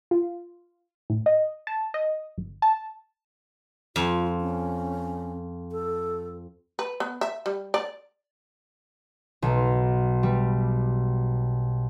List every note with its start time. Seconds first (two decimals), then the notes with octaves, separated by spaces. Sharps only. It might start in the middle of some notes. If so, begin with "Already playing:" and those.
0.11 F4
1.10 A2
1.26 D#5
1.67 A5
1.94 D#5
2.38 G1
2.62 A5
3.96 F2 F4
4.41 C#4
5.72 A4
6.79 B4
7.00 B3
7.21 E5
7.46 G3
7.74 D5
9.42 B1
10.23 G3